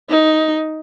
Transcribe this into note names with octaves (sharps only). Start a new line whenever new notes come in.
D#4